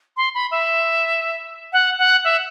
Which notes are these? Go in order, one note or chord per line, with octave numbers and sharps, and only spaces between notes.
C6
B5
E5
F#5
F#5
E5